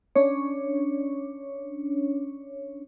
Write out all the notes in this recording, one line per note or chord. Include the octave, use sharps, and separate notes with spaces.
C#4 D4 C#5